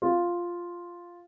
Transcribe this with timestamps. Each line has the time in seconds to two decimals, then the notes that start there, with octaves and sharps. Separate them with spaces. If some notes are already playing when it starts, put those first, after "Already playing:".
0.02 F4